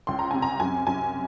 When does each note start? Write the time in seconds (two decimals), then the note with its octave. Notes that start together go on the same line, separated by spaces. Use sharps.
0.07 C#2 C6
0.19 A#5
0.31 C3 G#5
0.42 A#5
0.60 F#2 G#5
0.87 F#2 G#5